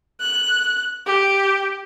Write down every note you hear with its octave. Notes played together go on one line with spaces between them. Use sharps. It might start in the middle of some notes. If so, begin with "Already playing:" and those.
F#6
G4